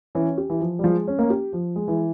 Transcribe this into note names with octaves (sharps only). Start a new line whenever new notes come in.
E3 C#4
G4
E3
F3
G3
F3 G#3
C#4
A#3
G4
F3
G#3
E3